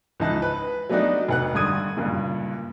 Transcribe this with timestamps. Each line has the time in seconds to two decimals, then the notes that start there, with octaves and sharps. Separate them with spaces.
0.20 C#2 E3 D#4 A5 F#6
0.42 B4
0.89 F#3 A3 B3 D4 D#4 F#4
1.29 F1 F#5 F#6
1.54 G2 D3 D#3 D#6 G#6 D#7
1.97 F#1 G2 A#2